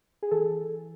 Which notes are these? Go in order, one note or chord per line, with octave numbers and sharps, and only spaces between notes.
G#4
E3 A4